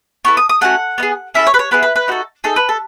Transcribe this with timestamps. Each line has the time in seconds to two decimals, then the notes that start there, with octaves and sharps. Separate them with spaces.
0.25 B3 E4 A4 C#6
0.37 D#6
0.49 D#6
0.61 A3 C#4 F#4 F#5
0.98 B3 D#4
1.03 G#4
1.34 C#4 E4 A4 E5
1.47 C#5
1.54 B4
1.59 C#5
1.71 B3 E4 G#4 B4
1.83 B4
1.96 B4
2.08 D#4 F#4 A4
2.44 D#4 G#4 A4
2.56 B4
2.69 A4